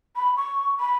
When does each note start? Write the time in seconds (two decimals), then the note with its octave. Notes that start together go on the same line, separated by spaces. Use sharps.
0.16 B5
0.37 C#6
0.80 B5